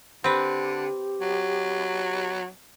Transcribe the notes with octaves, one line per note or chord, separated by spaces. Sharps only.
D3 C4 G4 B4
F#3